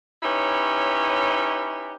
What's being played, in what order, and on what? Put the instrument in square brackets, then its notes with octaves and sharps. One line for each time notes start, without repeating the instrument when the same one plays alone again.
[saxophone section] C#4 D#4 E4 G4 B4 C#5